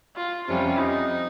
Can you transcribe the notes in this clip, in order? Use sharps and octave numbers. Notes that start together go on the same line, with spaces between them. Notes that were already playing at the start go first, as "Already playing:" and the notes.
F4
F2 C3 G3 C#4 F4
D#4